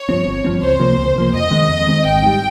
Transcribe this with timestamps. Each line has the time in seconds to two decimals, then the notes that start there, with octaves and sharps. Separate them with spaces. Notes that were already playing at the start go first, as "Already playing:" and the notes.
Already playing: C#5
0.09 G2 F3 C4
0.27 G1
0.44 G2 F3 C4
0.62 C#2 C5
0.80 C3 F3 A#3
0.98 C#2
1.16 C3 F3 A#3
1.34 F2 D#5
1.51 D#3 G#3 C4
1.69 F2
1.87 D#3 G#3 C4
2.05 G#1 G5
2.22 G#2 G3